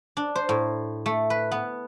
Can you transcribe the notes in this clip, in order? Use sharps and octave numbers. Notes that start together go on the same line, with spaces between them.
D4
C5
A2
A3
B4
B3